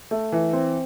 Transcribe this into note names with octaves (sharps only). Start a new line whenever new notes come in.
A3
E3
C4